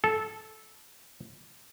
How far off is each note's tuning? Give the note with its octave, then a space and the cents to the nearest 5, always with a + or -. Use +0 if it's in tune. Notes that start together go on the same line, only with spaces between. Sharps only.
A4 -15